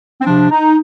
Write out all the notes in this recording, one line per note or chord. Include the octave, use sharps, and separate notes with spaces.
C4
C3 F3 D4
D#4